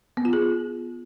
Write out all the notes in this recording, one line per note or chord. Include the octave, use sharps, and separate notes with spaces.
B3
F4
G#4